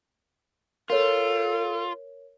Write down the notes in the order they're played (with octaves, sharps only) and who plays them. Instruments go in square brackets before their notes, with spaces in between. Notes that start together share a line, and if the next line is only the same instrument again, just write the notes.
[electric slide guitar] F4 [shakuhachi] A4 [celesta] A#4 C#5